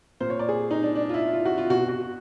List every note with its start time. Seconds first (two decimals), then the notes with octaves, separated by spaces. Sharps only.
0.20 A#2 C5
0.30 C#5
0.39 D5
0.49 G#4
0.71 D#4
0.83 D4
0.95 D4
1.09 F4
1.14 E4
1.33 F4
1.45 F#4
1.58 F4
1.70 B2 F#4
1.89 F#4